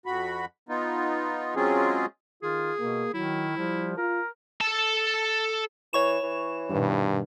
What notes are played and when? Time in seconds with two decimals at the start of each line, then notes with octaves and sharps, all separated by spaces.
0.06 F2 F#4 B5
0.69 B3 D#4 F4
1.56 F#3 G#3 C4 C#4 F4 G#4
2.43 D#3 F4 G#4
2.79 B2 A#3
3.14 D#3 F#3 E4
3.57 F3 G3
3.98 F4 A#4
4.61 A4 A5
5.93 E3 C#5 C#6 E7
6.23 E3
6.70 G2 B2 D#3